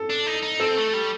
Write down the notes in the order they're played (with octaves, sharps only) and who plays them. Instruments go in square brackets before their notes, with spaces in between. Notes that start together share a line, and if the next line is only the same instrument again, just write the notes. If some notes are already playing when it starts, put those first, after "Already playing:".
Already playing: [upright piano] A4
[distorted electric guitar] D4
D#4
D#4
[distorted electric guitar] C4 [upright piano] A4
[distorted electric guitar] A3
G3